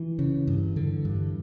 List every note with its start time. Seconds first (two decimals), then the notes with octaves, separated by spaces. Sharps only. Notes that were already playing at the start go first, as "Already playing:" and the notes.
Already playing: E3
0.19 C#3
0.47 G2
0.76 D3
1.05 G2